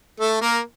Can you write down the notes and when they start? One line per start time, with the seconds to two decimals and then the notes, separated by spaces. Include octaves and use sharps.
0.20 A3 A4
0.41 A#3 A#4